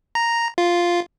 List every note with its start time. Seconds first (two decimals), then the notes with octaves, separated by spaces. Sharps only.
0.15 A#5
0.58 F4